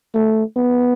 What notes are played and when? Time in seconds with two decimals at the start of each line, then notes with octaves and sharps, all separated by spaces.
0.15 A3
0.56 B3